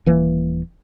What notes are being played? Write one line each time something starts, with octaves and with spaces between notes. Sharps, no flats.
D#1 E3 A#3